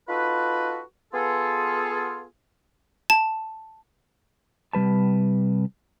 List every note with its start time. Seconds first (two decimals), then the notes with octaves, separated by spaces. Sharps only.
0.09 D#4 F4 F#4 A4 B4
1.14 B3 F4 G#4 A4
3.10 A5
4.73 C3 G3 B4 A5